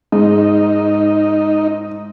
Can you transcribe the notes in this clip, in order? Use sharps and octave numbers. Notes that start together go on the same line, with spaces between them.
G#2 D#4